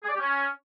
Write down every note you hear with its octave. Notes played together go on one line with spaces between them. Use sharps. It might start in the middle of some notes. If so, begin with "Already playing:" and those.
G#4
D5
G4
C#4